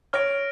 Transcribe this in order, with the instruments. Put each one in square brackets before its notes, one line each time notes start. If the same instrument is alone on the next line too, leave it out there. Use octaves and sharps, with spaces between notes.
[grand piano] C#5 [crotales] F6 A#6 D7